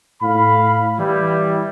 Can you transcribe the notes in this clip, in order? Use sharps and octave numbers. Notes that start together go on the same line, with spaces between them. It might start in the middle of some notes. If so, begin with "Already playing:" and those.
A2 F5 B5
E3 G3 E4